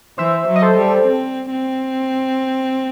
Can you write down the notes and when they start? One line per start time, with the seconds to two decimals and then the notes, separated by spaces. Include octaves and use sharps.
0.18 E3 C5 E5
0.47 F#3
0.55 D#5
0.62 A4 C5
0.77 G3
1.06 C4
1.51 C4